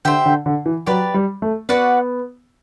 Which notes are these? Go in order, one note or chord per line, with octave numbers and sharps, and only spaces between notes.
D3 G4 C5 E5 G5
D3
D3
E3
F#3 G4 B4 D5
G3
A3
B3 F#4 B4 D5 F#5